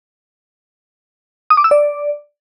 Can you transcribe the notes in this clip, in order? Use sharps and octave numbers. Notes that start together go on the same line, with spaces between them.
D#6
D6
E6
D5